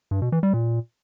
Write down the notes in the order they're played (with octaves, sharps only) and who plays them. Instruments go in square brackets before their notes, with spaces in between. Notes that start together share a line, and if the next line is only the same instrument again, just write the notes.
[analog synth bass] G2
B2
E3
G3
A#2